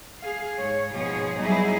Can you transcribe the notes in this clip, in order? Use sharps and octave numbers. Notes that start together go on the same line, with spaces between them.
G#4 F5
G#2 C#5
G#2 B2 F3 G#4 C#5
F#3 G3 B3 D#4 E4 G#4